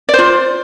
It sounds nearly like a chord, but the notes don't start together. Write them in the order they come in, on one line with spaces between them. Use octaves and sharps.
D5 C5 F4